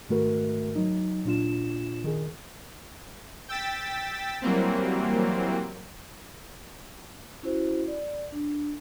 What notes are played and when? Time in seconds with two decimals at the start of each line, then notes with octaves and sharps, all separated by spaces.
0.09 G#2 D#3 A3 F#4 A#4 B4
0.75 F#3 D#4
1.25 A#2 D4 F4 E7
2.04 D#3 G#4
3.49 G5 E6 A6 B6
4.42 E3 F#3 G3 A#3 C4
7.43 C#4 E4 F#4 C5
7.88 D5
8.32 D4